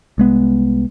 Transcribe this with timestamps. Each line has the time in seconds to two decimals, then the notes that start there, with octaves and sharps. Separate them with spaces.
0.18 C2 G#3 B3